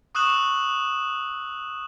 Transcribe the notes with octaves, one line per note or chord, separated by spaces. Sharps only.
C#6 D#6 E6 F#6 E7 F#7